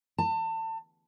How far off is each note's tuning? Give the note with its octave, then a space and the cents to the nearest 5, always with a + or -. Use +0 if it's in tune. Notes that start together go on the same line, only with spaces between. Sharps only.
A5 +30